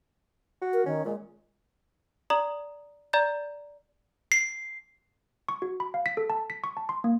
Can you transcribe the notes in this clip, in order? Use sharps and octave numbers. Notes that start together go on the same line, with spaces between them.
F#4
A#4
D#3 C#4
A#2 G#3
D5 A#5 D#6 F#7
D5 A#5 G6 A6
C7
C#6
F#4
B5
F5
B6
A4
A5
B6
C#6
A5
C6
A#3